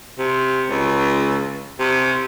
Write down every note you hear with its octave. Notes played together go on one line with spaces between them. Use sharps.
C3
C#2
C3